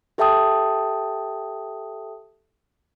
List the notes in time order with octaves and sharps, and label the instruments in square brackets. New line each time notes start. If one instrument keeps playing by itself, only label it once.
[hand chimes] G4 A4 E5 G5 A5 D#6